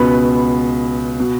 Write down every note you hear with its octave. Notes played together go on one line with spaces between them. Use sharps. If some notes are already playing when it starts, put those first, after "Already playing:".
Already playing: C#2 B2 B3 B4 B5
B2